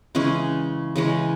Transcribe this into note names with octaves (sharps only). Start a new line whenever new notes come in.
C#3 E3 G#3 C#4 G#4
C#3 E3 G#3 C#4